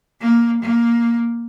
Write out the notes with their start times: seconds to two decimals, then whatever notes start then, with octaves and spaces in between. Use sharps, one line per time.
0.21 A#3
0.62 A#3